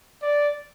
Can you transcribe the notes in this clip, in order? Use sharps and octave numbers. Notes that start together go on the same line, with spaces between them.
D5